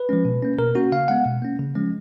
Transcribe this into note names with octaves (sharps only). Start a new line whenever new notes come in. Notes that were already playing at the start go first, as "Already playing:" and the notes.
Already playing: B4
F3 G#3 C#4
B2
A#3 C#4
B2 A#4
A#3 C#4 F#4
C#3 F5
G#3 B3 F#5
B2
A#3 C#4
C#3
F3 G#3 C#4